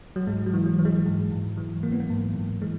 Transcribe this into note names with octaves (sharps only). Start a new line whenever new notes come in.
F#3
G#2 G#3
F#3
E3
F#3
E3
G#3
G#2
G#2
E3
E3 A#3
B3
A#3
G#2
G#2
E3 G#3